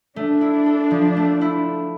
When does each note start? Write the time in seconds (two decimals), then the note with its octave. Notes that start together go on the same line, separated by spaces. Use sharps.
0.16 A3 D4
0.41 E4
0.66 A4
0.91 F3
1.17 A3
1.41 E4